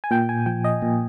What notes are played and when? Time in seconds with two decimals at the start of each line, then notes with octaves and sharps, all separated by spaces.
0.04 G#5
0.11 A#2 G5
0.29 G#5
0.46 F3 G5
0.64 D#5
0.82 A#2